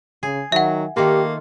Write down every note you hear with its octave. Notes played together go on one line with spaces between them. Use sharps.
C#3 G#4
D#3 F#3 E5 F#5
D#3 A3 A#3 F4 G4